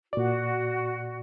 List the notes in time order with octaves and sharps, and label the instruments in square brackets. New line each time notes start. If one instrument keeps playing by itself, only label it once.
[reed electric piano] A#2 D5 [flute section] F#4